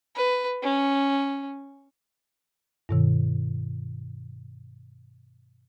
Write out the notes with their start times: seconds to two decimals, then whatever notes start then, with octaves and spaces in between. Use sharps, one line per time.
0.15 B4
0.62 C#4
2.89 G2 B2 D#3